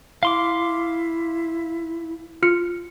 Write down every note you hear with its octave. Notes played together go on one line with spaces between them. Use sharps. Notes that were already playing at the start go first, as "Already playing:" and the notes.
E4 F5 C6 D6
F4 F6 C#7